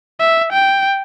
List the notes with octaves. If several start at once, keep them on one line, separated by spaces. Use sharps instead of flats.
E5
G5